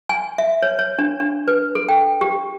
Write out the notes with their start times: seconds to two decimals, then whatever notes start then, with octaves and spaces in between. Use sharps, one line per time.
0.09 G#5
0.38 E5
0.62 C#5
0.79 C#5
0.99 D4
1.20 D4
1.48 B4
1.75 A4
1.89 G5
2.21 G4